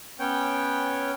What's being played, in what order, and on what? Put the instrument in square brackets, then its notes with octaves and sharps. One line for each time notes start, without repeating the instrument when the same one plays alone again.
[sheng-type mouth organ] B3 C#4 C#5 G5